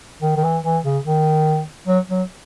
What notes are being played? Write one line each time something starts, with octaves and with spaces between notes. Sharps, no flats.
D#3
D#3
E3
E3
C#3
D#3
F#3
F#3